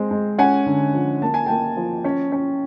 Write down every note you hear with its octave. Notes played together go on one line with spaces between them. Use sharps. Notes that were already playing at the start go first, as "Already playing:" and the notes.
Already playing: G#3 C4
G#3
C#4 F#5 G#5
D3
F3
A#3 A5
G#5
A#3 G5 A5
F3
C#4
C#4